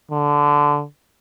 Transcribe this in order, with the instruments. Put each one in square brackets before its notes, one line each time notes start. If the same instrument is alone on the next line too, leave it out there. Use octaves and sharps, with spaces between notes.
[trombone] D3